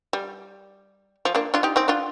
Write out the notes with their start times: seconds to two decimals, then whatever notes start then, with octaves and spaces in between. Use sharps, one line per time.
0.13 G3
1.25 F3
1.35 A#3 D4
1.54 D4 F4
1.63 D#4 G4
1.76 C4 D#4
1.88 D4 F4